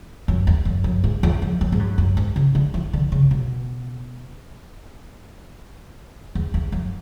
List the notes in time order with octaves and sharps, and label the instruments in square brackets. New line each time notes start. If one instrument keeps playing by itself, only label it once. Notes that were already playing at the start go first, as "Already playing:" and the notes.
[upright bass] F#2
E2
F#2
F#2
G#2
E2
F#2
F#2
G#2
F#2
F#2
G#2
C#3
D3
E3
D3
C#3
B2
E2
E2
F#2